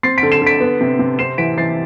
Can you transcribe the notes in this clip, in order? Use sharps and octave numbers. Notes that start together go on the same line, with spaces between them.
C4 A6 C7
B6 D7
D3
C7 E7
D3 B6 D7
B3
C3
C3
C4 C7 E7
E3 B6 D7
E3 A6 C7